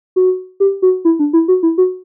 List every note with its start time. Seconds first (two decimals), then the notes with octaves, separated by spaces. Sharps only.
0.16 F#4
0.60 G4
0.82 F#4
1.05 E4
1.19 D4
1.33 E4
1.48 F#4
1.63 E4
1.78 F#4